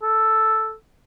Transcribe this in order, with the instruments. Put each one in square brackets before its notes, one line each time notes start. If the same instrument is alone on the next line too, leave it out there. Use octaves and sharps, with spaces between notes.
[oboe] A4